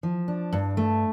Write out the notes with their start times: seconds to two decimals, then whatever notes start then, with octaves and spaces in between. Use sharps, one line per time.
0.03 F3
0.28 D4
0.53 G2
0.77 A3